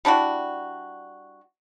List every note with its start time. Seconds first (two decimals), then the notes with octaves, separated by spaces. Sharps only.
0.05 G3 D4 E4 F#4